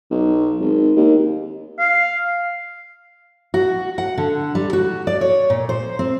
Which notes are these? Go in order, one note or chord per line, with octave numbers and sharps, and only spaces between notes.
B1
G#1
D#2
F5
F#4
F#5
D3
G3
F#4
D5
C#5
A#2
C5
C4